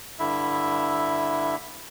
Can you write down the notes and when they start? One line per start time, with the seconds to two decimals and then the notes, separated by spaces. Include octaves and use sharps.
0.19 G2 D3 E4 E5